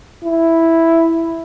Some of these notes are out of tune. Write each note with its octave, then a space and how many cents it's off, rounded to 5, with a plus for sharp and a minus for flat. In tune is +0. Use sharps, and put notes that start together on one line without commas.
E4 +0